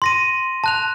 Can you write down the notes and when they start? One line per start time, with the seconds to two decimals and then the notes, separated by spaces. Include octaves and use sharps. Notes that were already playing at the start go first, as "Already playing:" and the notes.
0.02 C6 A#6 D#7
0.64 A5 F#6 F7